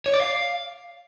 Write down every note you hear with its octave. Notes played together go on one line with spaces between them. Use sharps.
C#5
D5
F5